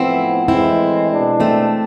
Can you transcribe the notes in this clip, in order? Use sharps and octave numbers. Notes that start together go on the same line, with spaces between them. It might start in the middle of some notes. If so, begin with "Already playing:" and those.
Already playing: A2 F3 B3 C4 E4
A2 E3 G#3 C4 E4
B2 G#3 D4
A3 C4